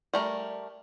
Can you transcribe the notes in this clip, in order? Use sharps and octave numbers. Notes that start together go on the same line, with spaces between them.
G3 A3 A#4